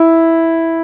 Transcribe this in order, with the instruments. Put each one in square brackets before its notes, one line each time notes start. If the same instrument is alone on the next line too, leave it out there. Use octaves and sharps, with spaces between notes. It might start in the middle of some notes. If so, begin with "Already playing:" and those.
Already playing: [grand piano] E4